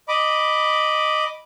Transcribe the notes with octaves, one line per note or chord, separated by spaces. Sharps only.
D#5 B5 D6